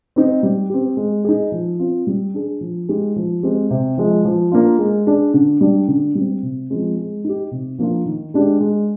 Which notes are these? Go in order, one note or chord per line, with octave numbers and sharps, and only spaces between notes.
C4 D#4
G3
C4 G4
G#3
D#4 G#4
F3
C4 F4
G3
D4 G#4
F3
G#3 D#4 G4
F3
G#3 C4 G4
C3
F3 G#3
F3
A#3 D4 F4
G#3
D4 G#4
D3
G3 D4
D3
G3 C4
C3
F3 G#3 C4
G#3
D#4 G4
C3
F3 A#3 D4 F4
D#3
G#3 D4 G4
G#3